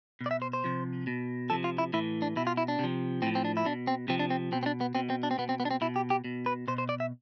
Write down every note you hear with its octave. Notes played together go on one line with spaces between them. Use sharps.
B2
D5
E5
C5
C5
C3 F3
B2
C3 F3 A4
F4
E4
A2 E3 E4
D4
B2 E4
F4
E4
D4
C3 F3
A2 F3 C4
C4
D4
E4
B2 D4
C4
C3 F3 C4
D4
C4
B2 C4
C4
D4
B3
B2 C4
C4
D4
C4
B2 B3
C4
B3
D4
C4
B2 E4
G4
G4
B2
B4
B2 C5
C5
D5
E5